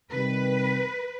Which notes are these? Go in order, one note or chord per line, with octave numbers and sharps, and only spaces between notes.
C3 D#3 G3 B4